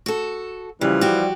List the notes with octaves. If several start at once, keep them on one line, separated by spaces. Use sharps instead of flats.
F#4 A4
C#3 E3 F3 G3
F#4 G4